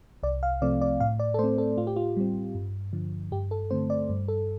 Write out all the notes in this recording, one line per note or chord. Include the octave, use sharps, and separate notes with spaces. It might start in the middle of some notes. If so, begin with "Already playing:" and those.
C2 D5
F5
C3 F3 A3 C4 D5
D5
A2 F5
D5
A4
A3 C4 C5
A4
A2 F4
G4
F4
G3 C4
G2
D3 F3
G2 G4
A4
D3 A3 C4 C5
D5
G2
A4